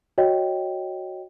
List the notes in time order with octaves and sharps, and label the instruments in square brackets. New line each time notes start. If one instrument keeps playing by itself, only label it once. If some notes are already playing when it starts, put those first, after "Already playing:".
[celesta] F#4 C#5 D#5 G5